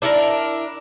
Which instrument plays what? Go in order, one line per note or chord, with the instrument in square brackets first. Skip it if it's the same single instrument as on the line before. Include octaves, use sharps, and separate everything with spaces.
[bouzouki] D4 E4 A4 A#4